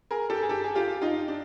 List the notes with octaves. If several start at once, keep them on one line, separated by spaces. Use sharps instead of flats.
G#4 A#4
G4 A4
G#4
G4 A4
G#4
F4 G4
D#4 F4
D4